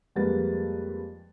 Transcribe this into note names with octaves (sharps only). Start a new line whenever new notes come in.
F2 G3 G#3 A#3 B4 A6